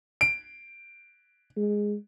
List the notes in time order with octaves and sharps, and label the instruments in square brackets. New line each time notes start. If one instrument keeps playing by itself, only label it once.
[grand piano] D7
[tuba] G#3